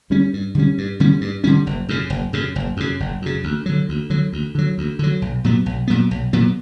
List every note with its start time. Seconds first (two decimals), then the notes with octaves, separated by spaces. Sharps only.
0.10 D3 G3 C#4
0.33 G2
0.55 D3 G3 C#4
0.78 G2
1.00 D3 G3 C#4
1.21 G2
1.44 D3 G3 C#4
1.67 F#1
1.89 F#2 C#3
2.10 F#1
2.33 F#2 C#3
2.56 F#1
2.77 F#2 C#3
3.00 F#1
3.22 F#2 C#3
3.44 D2
3.66 D3 F#3
3.89 D2
4.10 D3 F#3
4.33 D2
4.55 D3 F#3
4.78 D2
4.99 D3 F#3
5.22 B1
5.44 A#2 F#3 B3
5.66 B1
5.88 A#2 F#3 B3
6.11 B1
6.33 A#2 F#3 B3